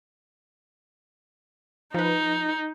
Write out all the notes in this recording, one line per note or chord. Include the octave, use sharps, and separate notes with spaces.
F3 D#4 B4